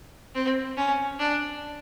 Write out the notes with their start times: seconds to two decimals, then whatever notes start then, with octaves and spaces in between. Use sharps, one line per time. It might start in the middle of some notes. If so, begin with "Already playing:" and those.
0.35 C4
0.77 C#4
1.19 D4